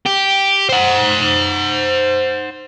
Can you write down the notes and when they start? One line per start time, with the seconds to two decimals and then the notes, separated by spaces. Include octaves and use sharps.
0.06 G4
0.69 C5 F#5